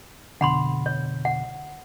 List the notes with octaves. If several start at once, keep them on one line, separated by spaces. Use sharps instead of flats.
F2 B2 D3 F#5 B5 C6
C#5
F#5